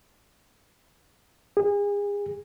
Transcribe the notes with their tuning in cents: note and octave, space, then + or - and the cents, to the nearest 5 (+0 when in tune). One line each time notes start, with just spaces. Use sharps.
G#4 -35